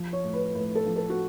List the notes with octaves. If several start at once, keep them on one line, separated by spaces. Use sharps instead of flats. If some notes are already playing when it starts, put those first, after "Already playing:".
Already playing: F3
C#5
A2
B4
A2 B4
A4
F3
A4
F#4